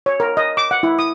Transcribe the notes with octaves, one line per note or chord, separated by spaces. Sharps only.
C#5
A#4
D#5
D6
F#5
E4
D#6